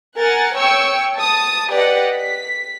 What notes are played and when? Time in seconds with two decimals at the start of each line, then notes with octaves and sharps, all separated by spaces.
0.17 A#4 F#5 G#5 A6
0.56 C#5 G5 C#6 E6
1.16 A5 D#6
1.71 G4 B4 D5 D#5 F#5
2.14 B6